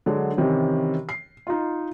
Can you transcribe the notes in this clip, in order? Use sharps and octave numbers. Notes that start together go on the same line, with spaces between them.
D3 F#3 G#3
C3 D#3 E3 C#4
C7
D#4 F4